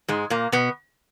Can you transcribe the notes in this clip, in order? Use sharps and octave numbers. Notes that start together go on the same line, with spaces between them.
G#2 G#3
A#2 A#3
B2 B3